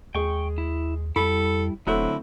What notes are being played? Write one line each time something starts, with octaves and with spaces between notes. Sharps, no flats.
D#2 G#3 G#4 G5 C#6
E4
F2 G3 E4 A4 B5
E1 D3 F#3 A3 C4 E4 B5 F#6